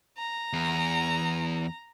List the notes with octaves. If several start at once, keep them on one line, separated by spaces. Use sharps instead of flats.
A#5
E2